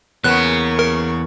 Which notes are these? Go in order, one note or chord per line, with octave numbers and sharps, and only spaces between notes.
E2 C#3 A#3 B3 C#6 F#6
A#4